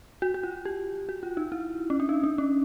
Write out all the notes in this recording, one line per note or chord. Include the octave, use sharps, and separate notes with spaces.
F#4
F#4
F4
G4
F#4
F4
D#4
E4
C#4
D4
D#4
D4
C#4